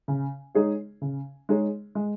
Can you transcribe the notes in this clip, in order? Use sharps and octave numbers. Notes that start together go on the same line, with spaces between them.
C#3
G#3 D#4 G#4 C#5
C#3
G#3 D#4 G#4 C#5
G#3